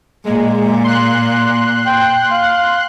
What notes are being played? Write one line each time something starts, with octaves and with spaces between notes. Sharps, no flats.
A#2 G#3
C6 F#6
G5
F5